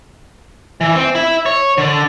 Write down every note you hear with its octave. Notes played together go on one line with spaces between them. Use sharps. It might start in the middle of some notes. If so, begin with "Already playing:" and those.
E3
C4
E4
C#5
D3